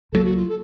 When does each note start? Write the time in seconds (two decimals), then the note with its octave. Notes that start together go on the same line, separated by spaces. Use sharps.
0.12 C#2 C3 F#3 A#3 A4
0.25 F#4
0.36 F4
0.48 A4